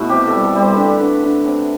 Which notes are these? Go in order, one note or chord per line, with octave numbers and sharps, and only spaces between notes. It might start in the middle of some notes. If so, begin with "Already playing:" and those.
Already playing: B2 A3 E4
C3 G4
A4
G3
A4
G3
C5
D3 B4
A4
D3 B4
D3
C3